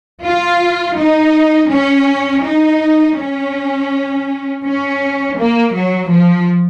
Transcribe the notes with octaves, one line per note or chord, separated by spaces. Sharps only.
F4
D#4
C#4
D#4
C#4
C#4
A#3
F#3
F3